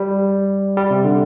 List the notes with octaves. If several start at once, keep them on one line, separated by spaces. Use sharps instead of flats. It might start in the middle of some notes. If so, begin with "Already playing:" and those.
Already playing: G3
G3
C3
D3